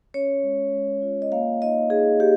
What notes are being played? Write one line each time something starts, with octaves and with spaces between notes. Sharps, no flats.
C#4 C#5
G#3
G#3
F4
D#5
A#3 F5
D#4 D#5
D#4 G#4
A#3 G4